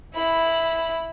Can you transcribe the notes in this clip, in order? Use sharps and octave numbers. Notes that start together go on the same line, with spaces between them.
E4 B5